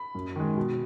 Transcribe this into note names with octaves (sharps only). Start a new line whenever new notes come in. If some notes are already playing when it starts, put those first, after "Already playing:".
Already playing: B5
F#2
D#3 G#3
B2